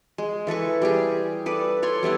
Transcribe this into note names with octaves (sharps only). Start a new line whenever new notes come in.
G#3
E3 A4 B4 C#6
G3 G4 G#4
A4 B4 D5
A4 C#5 C6
G3 B3 E4 F#5